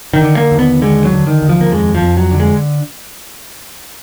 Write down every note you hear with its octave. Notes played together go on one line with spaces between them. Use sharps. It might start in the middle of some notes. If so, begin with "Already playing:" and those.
D#3
D3
A#3
D#2
B3
D3 G#3
F#3
D3
D#3
D#2
F3
A#3
F2 G#3
F3
F2
F#3
D3
G#3